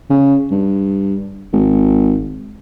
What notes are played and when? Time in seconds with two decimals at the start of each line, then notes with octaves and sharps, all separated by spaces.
0.10 C#3
0.51 G2
1.53 G#1